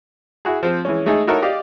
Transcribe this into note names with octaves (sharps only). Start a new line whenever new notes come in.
E4 F#4 G#4
F3 C4
E3 G#3 C#4
G#3 A3 D#4 G#4 A4 D#5
D#4 E4 F#4 A4 A#4 C#5
G4 D5 D#5 F5